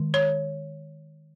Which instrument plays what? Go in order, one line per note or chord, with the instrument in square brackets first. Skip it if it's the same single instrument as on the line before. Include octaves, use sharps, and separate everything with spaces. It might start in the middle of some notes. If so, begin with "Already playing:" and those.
Already playing: [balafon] D#3 G#3
C#5